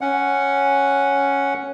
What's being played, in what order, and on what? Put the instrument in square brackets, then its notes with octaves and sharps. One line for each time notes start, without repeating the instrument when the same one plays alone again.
[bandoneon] C#4 F#5